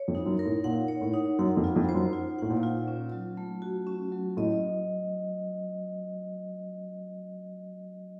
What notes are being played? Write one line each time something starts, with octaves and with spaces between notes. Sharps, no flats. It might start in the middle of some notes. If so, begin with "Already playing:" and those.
Already playing: C#5
F2
D#4
F#2
A#4
A2
A#2 F#5
C#5
A2
D#4
F#2 F#5
F2
F4
F2
C5
F#2
F4
A2 F#5
A#2
F4
C#4
F#3
A3
F#4
C#4
F#3
A2 D#5